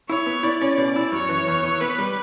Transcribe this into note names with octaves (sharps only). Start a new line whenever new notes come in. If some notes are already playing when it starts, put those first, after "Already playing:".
E4 C#5
B3
E4 D5
C#4
B2
E4
F#2 C#5
E3
E2
E3
B3 B4
G3